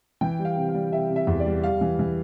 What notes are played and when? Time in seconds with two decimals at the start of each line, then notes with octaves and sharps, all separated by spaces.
0.21 E3 G5
0.39 G3
0.45 F5
0.56 C3
0.69 F5
0.74 G3
0.92 C3 E5
1.10 C3
1.16 E5
1.27 E2
1.40 D5
1.46 G3
1.63 G3 F5
1.81 E3
1.99 E3